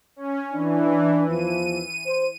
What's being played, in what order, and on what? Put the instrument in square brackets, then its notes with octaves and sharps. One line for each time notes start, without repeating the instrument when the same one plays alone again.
[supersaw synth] C#4
[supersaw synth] E3 [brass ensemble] D4
[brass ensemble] E2 F3 [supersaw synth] D#7
[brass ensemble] C5